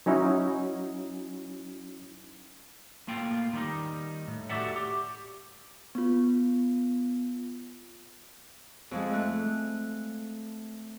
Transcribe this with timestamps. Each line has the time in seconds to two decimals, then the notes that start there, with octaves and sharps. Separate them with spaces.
0.06 F#3 C#4 D#4 E4 F#4
3.07 A2 A#3 F4 G5
3.53 D#3 G3 D#4
4.28 A2
4.49 F#4 G4 A4 D5 E5 F#5
4.76 G4
5.95 B3 F4
8.91 F2 F3 G#3
9.13 A3 F#6